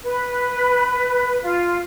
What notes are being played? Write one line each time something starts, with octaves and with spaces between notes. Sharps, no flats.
B4
F4